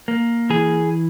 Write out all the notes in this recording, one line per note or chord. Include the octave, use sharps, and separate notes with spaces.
A#3
E3 G#4